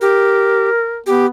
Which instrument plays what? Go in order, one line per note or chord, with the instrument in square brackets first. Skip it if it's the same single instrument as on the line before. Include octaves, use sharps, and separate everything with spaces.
[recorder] G4 [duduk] A#4
[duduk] B3 [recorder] G4